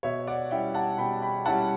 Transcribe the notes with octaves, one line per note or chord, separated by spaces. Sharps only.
B2 C#5 E5
D5 F#5
G3 C#4 E4 E5 G5
F#5 A5
B2 G5 B5
G5 B5
G3 C#4 E4 F#5 A5